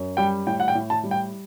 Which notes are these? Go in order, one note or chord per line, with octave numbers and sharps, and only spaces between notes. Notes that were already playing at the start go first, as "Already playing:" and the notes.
Already playing: F#2
G3 G5
A2 G5
F#5
G5
A2
A5
G3
G5